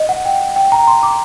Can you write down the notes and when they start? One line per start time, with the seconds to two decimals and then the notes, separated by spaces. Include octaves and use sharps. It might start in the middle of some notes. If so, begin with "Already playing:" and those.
Already playing: D#5
0.09 F#5
0.25 G5
0.56 G5
0.72 A#5
0.88 C6
1.03 D6